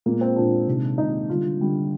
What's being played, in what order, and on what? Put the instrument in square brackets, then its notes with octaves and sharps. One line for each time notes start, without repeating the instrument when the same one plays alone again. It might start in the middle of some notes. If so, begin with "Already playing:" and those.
[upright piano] A#2 G#3 A#3
C4
A#2 G#3 D4
C3 D#3 G#3
C3 D#3 G#3 D#4
D3 G3 F4
D3 G3